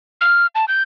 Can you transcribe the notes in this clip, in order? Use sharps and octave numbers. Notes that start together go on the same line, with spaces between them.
F6
A5
G6